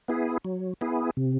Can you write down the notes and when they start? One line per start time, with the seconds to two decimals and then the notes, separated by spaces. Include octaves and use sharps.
0.08 B3 E4 G#4
0.45 F#3
0.81 B3 E4 G#4
1.17 C3